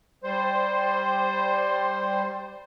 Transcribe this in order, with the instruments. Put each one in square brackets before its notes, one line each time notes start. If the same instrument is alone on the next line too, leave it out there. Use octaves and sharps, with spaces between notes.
[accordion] G3 C5